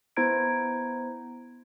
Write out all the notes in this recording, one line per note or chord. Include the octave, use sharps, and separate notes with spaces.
B3 E4 C5 A#5 G#6 D7